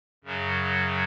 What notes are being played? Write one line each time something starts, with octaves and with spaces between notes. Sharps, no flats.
F#2 C#3 F#3